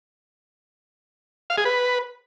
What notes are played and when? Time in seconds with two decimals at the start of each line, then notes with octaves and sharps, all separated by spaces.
1.50 F5
1.58 G#4
1.65 B4